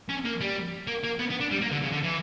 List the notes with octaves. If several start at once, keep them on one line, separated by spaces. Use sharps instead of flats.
C#4
A#3
G3
A#3
A#3
B3
B3
D4
G3
A#3
D3
C#3
D3
E3